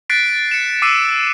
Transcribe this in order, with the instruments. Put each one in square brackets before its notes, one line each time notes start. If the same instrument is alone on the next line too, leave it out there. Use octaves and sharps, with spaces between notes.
[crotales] F#6 A6 B6 C7 D7
C#7 E7
D6 E6 C7 D#7 E7